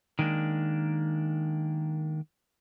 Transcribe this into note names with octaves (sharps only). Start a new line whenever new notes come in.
D#3 G#3 A#3 D4